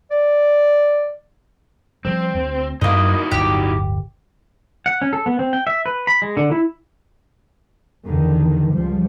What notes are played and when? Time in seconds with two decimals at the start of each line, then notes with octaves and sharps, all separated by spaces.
0.11 D5
2.05 F3 G3 C4
2.35 D2
2.81 F#2 A#3 D#4 E4 F#4 D#5
3.31 D1 G1 G4
4.86 F#5
5.02 C#4
5.13 A4
5.26 B3
5.39 C4
5.53 G5
5.67 E5
5.86 B4
6.07 B5
6.22 G#3
6.37 D3
6.52 E4
8.06 E2 D3 D#3
8.71 C#2 F3 G3